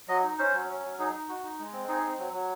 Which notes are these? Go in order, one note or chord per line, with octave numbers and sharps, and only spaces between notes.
F#3 D#5
D#4
C#4 C5
F#3
C#4
F#3
D#4 G#4
D#4
F#4
D#4
G#3
C4
D#4 G#4
C4
F#3
F#3